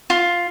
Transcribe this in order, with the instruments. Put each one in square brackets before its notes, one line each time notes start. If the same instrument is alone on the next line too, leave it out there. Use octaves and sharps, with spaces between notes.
[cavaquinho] F4